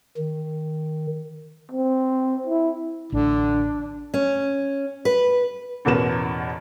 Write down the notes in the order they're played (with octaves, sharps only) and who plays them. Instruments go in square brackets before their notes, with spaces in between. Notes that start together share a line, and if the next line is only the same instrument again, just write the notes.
[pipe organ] D#3
[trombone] C4
E4
[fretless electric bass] A1 [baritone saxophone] D3 [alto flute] D4
[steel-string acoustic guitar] C#4
B4
[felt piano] A1 E2 B2 A#4 B4 E7